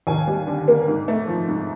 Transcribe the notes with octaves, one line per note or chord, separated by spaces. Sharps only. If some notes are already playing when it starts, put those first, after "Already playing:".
D#2 G#5
G3
D3
A#3
G#2
A3
F3
G#2